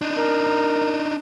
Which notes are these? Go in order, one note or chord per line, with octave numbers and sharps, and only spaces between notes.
D4 D#4
A#4